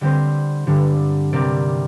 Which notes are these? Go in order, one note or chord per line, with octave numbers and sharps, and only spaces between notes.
D3 G3 C4 G4 C5
G2 D3 G3 D4
C3 G3 C4 A#4 D5